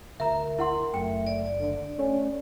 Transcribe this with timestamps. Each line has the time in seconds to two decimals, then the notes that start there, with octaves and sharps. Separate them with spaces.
0.20 D2 A#4 E5 A#5
0.59 E4 F#5 C6
0.94 F#1 A3 G5
1.27 D5
1.60 D3
1.99 A3 C#4